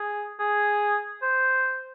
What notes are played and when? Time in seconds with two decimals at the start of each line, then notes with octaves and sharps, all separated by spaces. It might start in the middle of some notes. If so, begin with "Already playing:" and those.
Already playing: G#4
0.39 G#4
1.23 C5